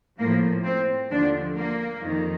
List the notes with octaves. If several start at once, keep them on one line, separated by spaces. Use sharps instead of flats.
A2 F3 A#3
C4
D#2 D3 F3 D4
A#3
F2 D#3